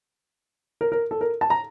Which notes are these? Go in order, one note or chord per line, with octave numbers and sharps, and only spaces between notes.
A#4
A#4
A4
A#4
A5
A#5